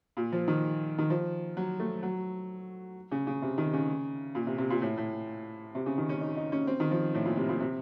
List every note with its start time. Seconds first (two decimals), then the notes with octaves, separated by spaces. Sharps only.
0.17 A#2
0.32 F3
0.48 D#3
0.98 D#3
1.10 F3
1.57 F#3
1.80 A3
2.03 F#3
3.12 C#3
3.27 C#3
3.42 C3
3.58 D#3
3.74 C#3
4.35 A#2
4.47 C3
4.58 C3
4.70 A#2
4.82 A2
4.97 A2
5.75 C3
5.86 C#3
5.98 D#3
6.09 C#4
6.21 D#4
6.37 D#4
6.52 C#4
6.67 C4
6.80 D#3
6.91 F3
7.14 A2
7.25 A#2
7.37 C3
7.49 A#2
7.60 C3